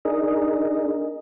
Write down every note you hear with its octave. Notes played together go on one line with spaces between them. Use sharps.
D4 D#4 G#4 A#4 D#5